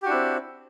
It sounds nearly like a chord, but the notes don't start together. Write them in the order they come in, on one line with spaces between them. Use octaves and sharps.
G4 F#4 D4 E4 C4